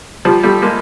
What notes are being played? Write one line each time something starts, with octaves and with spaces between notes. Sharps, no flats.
F3 G3
G3 A3
G#3 A#3